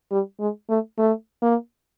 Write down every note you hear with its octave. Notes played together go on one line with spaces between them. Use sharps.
G3
G#3
A3
A3
A#3